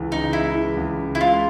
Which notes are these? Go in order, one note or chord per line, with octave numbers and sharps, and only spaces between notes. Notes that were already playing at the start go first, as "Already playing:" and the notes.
Already playing: C#2 E3 G#3
C#3 D#4
G#3 E4
E3
C#2
C#3
E4
G#3 F4